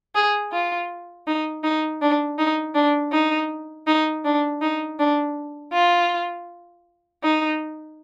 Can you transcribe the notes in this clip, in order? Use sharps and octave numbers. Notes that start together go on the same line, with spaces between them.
G#4
F4
D#4
D#4
D4
D#4
D4
D#4
D#4
D4
D#4
D4
F4
D#4